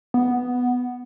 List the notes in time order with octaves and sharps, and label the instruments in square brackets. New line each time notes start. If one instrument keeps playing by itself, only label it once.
[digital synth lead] B3